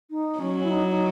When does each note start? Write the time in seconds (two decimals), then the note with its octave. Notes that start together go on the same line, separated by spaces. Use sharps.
0.10 D#4
0.39 F#3 C#4
0.63 E4
0.70 D#4
0.88 D#4